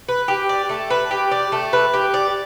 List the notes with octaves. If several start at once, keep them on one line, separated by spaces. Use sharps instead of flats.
B4
G4
D5
A3
B4
G4
D5
A3
B4
G4
D5